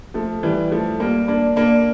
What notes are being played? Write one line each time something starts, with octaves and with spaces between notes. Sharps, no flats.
F3 A3
E3 G3
F3 A3
G3 A#3
A#3 D4
A#3 D4